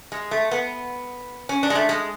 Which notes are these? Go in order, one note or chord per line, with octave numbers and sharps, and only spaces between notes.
G#3
A3
B3
C#4
D4
G#3
A3
G#3